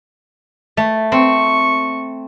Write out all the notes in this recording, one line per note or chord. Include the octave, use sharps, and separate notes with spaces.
A3
C4 C#6